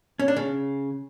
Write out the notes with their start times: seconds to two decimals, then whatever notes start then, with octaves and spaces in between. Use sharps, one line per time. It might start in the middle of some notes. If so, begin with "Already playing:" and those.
0.20 C#4
0.28 D4
0.36 C#3